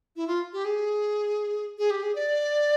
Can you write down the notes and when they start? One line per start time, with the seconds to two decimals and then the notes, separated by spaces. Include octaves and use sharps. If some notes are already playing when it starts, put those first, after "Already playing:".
0.16 E4
0.27 F4
0.53 G4
0.65 G#4
1.78 G#4
1.90 G4
2.02 G#4
2.15 D5